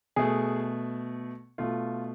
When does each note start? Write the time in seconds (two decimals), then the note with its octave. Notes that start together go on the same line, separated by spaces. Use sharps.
0.16 B2 A3 G#4
1.58 B2 A3 F4